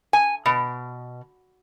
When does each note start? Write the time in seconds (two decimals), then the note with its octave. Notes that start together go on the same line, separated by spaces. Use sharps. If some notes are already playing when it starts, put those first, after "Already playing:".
0.13 G#5
0.46 B2